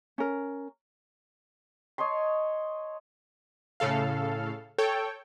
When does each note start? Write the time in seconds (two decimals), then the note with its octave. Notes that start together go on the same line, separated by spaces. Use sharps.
0.18 C#4 A#4
1.98 C#5 D#5 A5 C6
3.80 A2 C#3 A4 F5
4.78 A4 C#5 G5